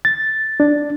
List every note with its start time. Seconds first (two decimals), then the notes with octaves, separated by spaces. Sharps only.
0.05 A6
0.60 D4